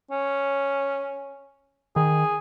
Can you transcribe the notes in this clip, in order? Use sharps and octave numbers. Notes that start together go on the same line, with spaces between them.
C#4
D#3 G#4